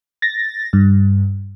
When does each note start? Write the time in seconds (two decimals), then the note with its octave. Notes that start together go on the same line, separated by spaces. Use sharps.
0.22 A6 A#6
0.73 G2